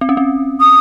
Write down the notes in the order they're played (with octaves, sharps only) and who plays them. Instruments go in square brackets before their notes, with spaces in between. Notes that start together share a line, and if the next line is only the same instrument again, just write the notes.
[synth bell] C4
C#4
C4
[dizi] D#6